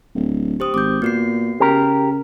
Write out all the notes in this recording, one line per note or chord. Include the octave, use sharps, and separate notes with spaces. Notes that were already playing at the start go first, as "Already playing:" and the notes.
D1
G4 C5 D#6
G#1 D6 G6
A#2 B3 F#4 C7
C#3 G4 A#4